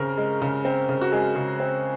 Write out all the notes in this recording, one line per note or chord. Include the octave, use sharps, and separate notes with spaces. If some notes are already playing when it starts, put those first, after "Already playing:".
Already playing: C#3 C4 A#4
G#3
C#3
C4
C#3
F#4
G#3 G#4
C#3
C4